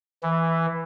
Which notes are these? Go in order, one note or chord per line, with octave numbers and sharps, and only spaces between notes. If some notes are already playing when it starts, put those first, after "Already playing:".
E3